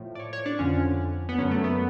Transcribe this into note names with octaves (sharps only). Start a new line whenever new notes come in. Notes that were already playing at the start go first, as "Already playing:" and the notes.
Already playing: A2 F3
D5
C#5
C#5
D4
F2 D3 F3 C#4
B3
F#2 D3 F#3 C#4
A3
B3